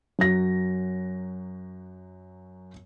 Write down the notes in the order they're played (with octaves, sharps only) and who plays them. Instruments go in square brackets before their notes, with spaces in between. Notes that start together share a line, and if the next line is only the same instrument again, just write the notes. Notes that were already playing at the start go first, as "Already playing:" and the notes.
[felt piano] F#2 F#3 A#6